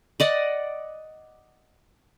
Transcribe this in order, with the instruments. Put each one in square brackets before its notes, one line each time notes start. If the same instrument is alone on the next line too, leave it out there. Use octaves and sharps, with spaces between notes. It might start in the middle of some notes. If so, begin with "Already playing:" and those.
[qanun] D5 D#5 F#5